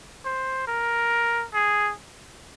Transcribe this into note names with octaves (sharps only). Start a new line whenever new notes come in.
C5
A#4
G#4